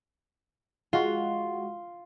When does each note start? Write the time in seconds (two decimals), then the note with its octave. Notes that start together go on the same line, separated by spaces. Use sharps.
0.93 G#3 F4 F#4